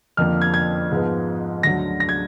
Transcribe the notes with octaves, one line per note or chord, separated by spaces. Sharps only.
F2 D3 F3 A#3 F6
G#6
G#6
G#2 F3 G#3 B3
D2 D3 F#3 A#6
A#6
G#6